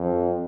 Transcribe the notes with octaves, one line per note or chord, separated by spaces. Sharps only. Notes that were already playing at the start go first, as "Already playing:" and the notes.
Already playing: F2